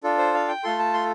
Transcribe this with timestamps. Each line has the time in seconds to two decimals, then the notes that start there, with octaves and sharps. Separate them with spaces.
0.03 D4 F4 A4
0.18 C5
0.34 F5
0.48 G5
0.63 A3 F4 A4 C6
0.79 A5
0.94 C6